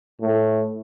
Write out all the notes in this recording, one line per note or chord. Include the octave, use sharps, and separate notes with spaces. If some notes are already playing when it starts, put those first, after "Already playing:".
A2